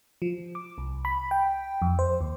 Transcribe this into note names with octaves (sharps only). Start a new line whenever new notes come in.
F3
D6
C2
B5
G5
F2
C5
D#2